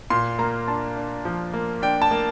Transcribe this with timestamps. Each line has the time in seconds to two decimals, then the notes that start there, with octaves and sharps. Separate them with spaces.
0.10 A#2 C6
0.39 A#3 A#5
0.68 D4 A5
0.96 D4
1.25 F3
1.54 A#3
1.82 D4 G5
2.02 A5
2.11 A#3